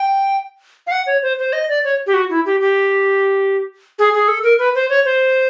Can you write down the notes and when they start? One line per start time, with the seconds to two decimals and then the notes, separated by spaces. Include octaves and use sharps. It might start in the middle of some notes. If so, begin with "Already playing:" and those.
Already playing: G5
0.87 F5
0.91 F#5
1.07 C#5
1.23 C5
1.38 C5
1.53 D#5
1.69 D5
1.84 C#5
2.07 G4
2.14 F#4
2.30 E4
2.46 G4
2.61 G4
3.99 G#4
4.14 G#4
4.28 A4
4.43 A#4
4.59 B4
4.75 C5
4.89 C#5
5.05 C5